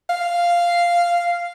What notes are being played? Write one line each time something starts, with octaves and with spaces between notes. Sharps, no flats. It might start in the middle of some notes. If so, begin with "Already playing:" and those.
F5